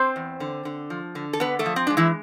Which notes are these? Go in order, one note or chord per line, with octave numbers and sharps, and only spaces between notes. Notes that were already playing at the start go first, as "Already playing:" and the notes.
Already playing: C4 C5
E2
D3
D3
F3
D3
A4
D3 B3 B4
A3 A4
F3
C4
G#3 D4
E3 E4